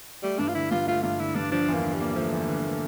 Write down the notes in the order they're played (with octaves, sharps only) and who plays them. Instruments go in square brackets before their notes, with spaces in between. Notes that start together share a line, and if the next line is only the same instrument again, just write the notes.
[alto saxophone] G3 [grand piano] A3
[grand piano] G2 [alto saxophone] D4
[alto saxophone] F4
[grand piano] D3 [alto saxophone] E4
[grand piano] G2 [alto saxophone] F4
[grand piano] A3 [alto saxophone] F4
[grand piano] G2 [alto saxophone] F4
[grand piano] D3 [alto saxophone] E4
[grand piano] G2 [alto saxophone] D4
[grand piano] F3 [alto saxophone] D4
[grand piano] E2
[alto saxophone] A#3
[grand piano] D3
[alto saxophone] G3
[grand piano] A#3
[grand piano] F3 [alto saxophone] A3
[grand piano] E2
D3
A#3